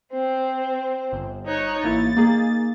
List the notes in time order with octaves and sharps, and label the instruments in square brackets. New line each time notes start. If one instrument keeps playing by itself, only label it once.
[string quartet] C4 C5
[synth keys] G1
[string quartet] D#4 C#5 F#6
[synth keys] A1 A#3 E4 [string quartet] A6
[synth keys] A#3 D#4 G#4